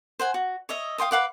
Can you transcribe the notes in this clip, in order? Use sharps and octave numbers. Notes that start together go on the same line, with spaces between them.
C5 F#5 G#5
F#4
C#5 D#5 E5
F5 G5 C6 D#6
B4 F5 F#5 D6